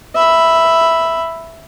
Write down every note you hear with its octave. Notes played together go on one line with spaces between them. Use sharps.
E5 B5